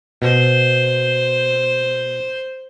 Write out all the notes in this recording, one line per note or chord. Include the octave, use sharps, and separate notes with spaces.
B2 C5